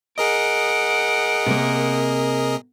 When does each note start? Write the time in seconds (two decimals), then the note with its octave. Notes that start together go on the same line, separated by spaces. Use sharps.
0.18 G#4 A#4 D#5 F#5 D7
1.46 C3 A#3